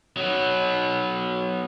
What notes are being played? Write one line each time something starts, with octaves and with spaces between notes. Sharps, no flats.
F#3 B3